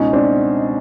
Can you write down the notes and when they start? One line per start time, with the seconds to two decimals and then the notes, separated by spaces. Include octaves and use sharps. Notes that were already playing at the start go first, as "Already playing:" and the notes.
Already playing: C#2 B2 C#4 D#4
0.13 C4 D4